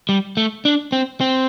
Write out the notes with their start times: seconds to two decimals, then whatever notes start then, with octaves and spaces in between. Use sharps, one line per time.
0.09 G3
0.37 A3
0.65 D4
0.92 C4
1.21 C4